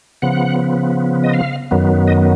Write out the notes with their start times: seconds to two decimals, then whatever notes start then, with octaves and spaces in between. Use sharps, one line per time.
0.22 C#3 F3 B3 F#5
1.24 D#5
1.34 F5
1.71 F#2 D#3 F#3 B3
2.08 D#5